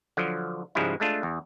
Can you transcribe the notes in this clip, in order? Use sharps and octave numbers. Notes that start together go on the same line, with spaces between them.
D3 F3 F#3
G#2 C#3 F3 G3 G#3 E4
G#3 A3 D4 F4
E2